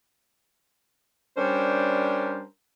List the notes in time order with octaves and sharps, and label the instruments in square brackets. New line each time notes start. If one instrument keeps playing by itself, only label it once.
[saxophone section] G3 C#4 D4 A#4 C5